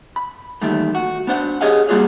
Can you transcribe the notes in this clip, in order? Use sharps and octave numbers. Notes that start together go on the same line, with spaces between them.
B5
E2 A#2 D#3 G3 A3
F#4
B3 D4 C5 F#5
G4 G#4 C#5 D#5 F5 F#5
G3 A#3 F4 F#4 G#4 C#5